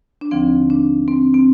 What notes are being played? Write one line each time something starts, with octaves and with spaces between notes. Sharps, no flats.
D4
D#2 D3 F3 C4
D4
C4
C4